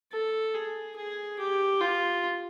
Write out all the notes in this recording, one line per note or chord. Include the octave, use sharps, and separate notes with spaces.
A4
G#4
G#4
G4
F4